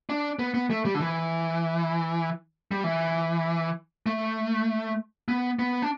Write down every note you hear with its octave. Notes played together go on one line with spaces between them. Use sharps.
D4
B3
B3
A3
G3
D3
E3
G3
E3
A3
B3
B3
D4